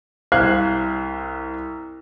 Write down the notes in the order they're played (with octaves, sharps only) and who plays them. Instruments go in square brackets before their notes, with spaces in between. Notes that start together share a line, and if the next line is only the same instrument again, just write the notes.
[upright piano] C2 C5 F5 F#6 G#6 C7